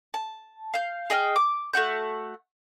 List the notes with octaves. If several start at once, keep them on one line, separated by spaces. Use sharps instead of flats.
A5
F5 G6
G#4 D#5 G5 F6
D6
A3 F#4 F#5 G6